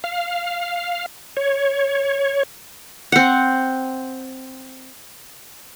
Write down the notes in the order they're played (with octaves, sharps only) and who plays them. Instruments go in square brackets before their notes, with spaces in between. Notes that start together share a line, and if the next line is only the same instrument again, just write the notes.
[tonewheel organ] F5
C#5
[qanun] C4 F#5